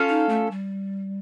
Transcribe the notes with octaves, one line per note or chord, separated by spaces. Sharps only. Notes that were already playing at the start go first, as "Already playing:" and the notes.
Already playing: C#4 F4 A4
D#4
A3
G3